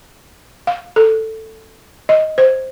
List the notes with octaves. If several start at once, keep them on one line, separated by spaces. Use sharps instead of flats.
F5
A4
D#5
C5